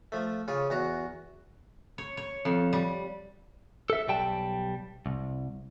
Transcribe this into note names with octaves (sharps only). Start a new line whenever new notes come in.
F3 A3
C#3 F4 G#4
E2 F#4 A#5
C#5
C#5
F2
G3
A4 E5
B1 G3 G5 A5
C2